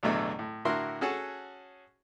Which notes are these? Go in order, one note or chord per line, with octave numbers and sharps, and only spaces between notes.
A1 E2 B2 D3 F#3 A3
A2
A2 D3 E4 F#4 A#4 C6
C#4 F#4 G#4 A4 F#5 A5